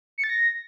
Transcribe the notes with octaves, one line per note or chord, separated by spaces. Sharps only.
C#7
A6
A#6